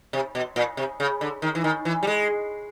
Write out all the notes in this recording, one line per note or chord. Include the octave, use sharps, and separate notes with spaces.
C3
B2
A#2
C3
C#3
D3
D#3
E3
D#3
E3
G3
G#3